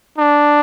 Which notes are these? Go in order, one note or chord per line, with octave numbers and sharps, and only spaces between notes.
D4